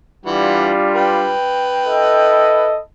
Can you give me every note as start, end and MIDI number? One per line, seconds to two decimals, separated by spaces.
0.26 0.71 52
0.26 1.35 55
0.26 1.35 62
0.26 1.35 65
0.26 0.71 78
0.96 2.72 71
0.96 2.72 79
1.88 2.80 64
1.88 2.80 69
1.88 2.80 75